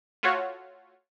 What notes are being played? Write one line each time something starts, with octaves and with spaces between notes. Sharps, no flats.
A3 F4 F#4 C#5